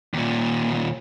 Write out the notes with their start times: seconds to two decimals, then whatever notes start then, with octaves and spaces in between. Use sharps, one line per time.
0.14 D#2 A#2